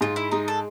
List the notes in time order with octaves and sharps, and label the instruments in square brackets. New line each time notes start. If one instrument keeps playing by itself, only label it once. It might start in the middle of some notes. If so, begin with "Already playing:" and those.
[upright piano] G#2 [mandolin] F4
[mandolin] E4
[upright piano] G#3 [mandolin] D#4
[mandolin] A4